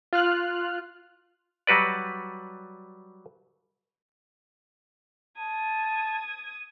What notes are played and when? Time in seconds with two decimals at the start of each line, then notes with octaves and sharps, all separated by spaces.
0.13 F4 F6 F#6
1.67 F#3 G3 F#4 B4 D5
5.38 A5 D#6 G#6